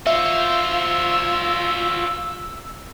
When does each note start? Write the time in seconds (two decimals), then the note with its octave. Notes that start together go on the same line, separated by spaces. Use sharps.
0.07 F4 F#4 C5 E5 E6